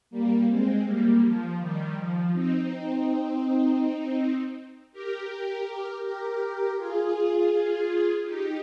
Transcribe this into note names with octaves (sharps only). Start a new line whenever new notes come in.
G3 A#3
G#3 C4
G3 A#3
F3
D#3 G3
F3
C4 D#4
G4 A#4
G4 A#4
F4 G#4
D#4 G4